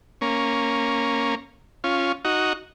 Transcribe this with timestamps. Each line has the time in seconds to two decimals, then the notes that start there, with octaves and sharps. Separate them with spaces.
0.21 A#3 C#4
1.84 C#4 F4
2.25 D#4 F#4